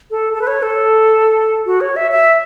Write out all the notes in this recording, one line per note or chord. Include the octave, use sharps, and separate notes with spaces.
A4
A4
B4
C#5
A4
F#4
C#5
E5
E5